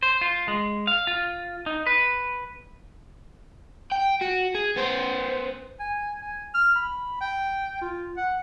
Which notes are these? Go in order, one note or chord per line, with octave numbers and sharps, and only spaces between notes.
C5
F4
G#3
F5
F4
D#4
B4
G5
F#4
G#4
B3 C5
G#5
G#5
F6
B5
G5
F4
F#5